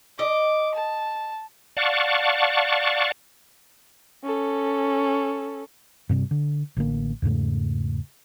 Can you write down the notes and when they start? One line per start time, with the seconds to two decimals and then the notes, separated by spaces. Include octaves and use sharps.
0.19 D#5 D6
0.74 A5
1.77 D5 F5 F#5 A5 C#6
4.24 C#4 A4
6.09 G2 C3 G3
6.31 D3
6.77 A1 D3 A#3
7.22 E2 G#2 C#3 A3